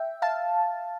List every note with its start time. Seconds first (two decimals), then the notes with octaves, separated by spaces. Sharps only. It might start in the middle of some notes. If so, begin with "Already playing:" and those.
Already playing: E5 G5
0.22 F5 A5